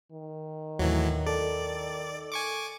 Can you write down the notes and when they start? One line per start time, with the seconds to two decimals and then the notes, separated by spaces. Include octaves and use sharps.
0.12 D#3
0.79 D#2 A2 E3 F#3
1.27 A4 D5
2.32 G#5 C#6 D6